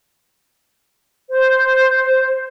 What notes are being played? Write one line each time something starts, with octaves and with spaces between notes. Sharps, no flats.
C5